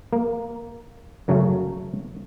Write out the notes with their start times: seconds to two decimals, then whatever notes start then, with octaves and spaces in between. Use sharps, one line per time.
0.13 A#3
1.28 F#2 C#3 F#3 A3